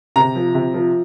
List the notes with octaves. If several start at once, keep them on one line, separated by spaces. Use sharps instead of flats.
C3 A#5
F3
C3
F3